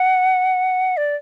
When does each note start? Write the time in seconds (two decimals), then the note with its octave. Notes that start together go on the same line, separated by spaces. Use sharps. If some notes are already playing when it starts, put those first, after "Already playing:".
Already playing: F#5
0.97 D5